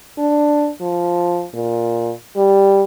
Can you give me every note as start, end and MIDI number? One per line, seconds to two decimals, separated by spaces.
0.18 0.70 62
0.81 1.45 53
1.54 2.13 46
2.37 2.84 55